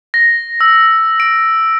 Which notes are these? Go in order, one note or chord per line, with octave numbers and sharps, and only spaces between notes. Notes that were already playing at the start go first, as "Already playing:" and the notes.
A#6
E6
D7